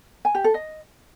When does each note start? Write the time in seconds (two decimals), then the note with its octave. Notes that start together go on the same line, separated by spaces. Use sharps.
0.25 G#5
0.35 G4
0.44 A4
0.54 D#5